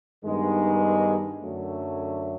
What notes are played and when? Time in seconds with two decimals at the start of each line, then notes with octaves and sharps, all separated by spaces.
0.23 G2 D#3 G#3 B3 D#4
1.42 F#2 D3 F#3 A3